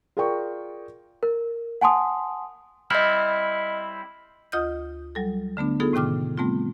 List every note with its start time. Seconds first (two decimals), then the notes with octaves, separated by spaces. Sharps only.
0.17 F4 G#4 A#4 D5 G5 C#6
1.23 A#4
1.81 F#5 G#5 A5 C6 D#6
2.90 G3 C4 E4 D#5 F6
4.52 D2 F4 D#5 D#6 F6 G6
5.15 F#3 G3 A4
5.57 D3 A3 B3 D4
5.80 B3 D#4 F4 G#4 A4
5.93 A2 C3 D#3 G5 D6 F6
6.38 G3 A3 B3 C4 F4